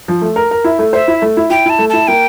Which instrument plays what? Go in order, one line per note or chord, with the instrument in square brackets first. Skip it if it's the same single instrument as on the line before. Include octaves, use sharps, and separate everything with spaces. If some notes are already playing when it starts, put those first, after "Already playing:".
[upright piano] F3
A3
A#4
A#4
E4
A3
[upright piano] C5 [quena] E5
[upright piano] E4
A3
E4
[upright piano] E4 [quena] G5
[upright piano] E4 [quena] A5
[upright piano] A3
[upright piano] E4 [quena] A5
[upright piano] A#3 [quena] G5